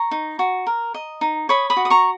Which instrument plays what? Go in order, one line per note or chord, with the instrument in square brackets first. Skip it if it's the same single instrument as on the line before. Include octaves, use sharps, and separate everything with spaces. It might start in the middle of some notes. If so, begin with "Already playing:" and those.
Already playing: [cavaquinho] A#5 C#6
D#4
F#4
A#4
D#5
D#4
C#5 B5 D#6
B5 D#6
F#4
D#6
A#5 C#6